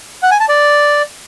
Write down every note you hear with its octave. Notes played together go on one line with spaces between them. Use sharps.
F#5
G#5
A5
D5